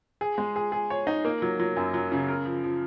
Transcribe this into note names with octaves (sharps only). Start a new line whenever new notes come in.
G#4
G#3
G#4
G#4
C#5
D#4
A#3
F#3
F#3
F#2
F#3
C#3
A#4
F3
F3